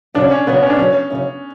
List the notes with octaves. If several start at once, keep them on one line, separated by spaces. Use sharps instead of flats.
F#2 C#3 F#3 D4
C#4
F#2 C#3 F#3 B3
C#4
D4
F#2 C#3 F#3 C#4
F#2 C#3 F#3